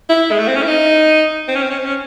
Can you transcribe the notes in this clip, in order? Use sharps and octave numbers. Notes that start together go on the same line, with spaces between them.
E4
G#3
A3
C4
C#4
E4
D#4
C4
C#4
C4
C#4
C4
C#4